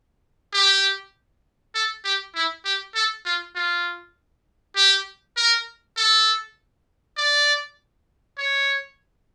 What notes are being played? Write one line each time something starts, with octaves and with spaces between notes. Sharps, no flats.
G4
A4
G4
E4
G4
A4
F4
F4
G4
A#4
A4
D5
C#5